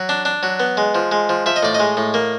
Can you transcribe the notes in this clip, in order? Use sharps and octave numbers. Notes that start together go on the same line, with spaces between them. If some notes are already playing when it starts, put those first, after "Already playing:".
Already playing: F#3
D4
D4
F#3
B3
G#3
F3
G#3
F3
F3 E5
D#5
A2 D5
D#5
G#3
A2
A#3